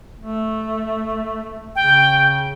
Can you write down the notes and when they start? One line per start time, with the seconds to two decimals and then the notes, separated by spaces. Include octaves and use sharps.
0.19 A3
1.76 C#3 G5